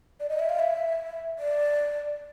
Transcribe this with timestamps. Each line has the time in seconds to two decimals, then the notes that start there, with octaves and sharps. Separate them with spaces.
0.20 D5
0.29 D#5
0.39 E5
0.49 F5
0.59 E5
1.39 D5